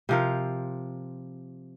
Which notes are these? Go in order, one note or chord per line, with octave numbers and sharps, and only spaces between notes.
C3 F3 A#4